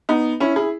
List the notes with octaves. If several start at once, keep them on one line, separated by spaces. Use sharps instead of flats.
B3 D#4
C#4 E4
E4 G#4